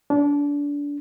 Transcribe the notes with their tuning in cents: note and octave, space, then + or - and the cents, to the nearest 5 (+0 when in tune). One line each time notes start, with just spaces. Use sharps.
D4 -30